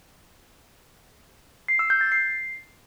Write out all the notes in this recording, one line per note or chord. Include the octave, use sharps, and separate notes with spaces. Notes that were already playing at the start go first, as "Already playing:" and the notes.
C7
E6
G6
A6
C7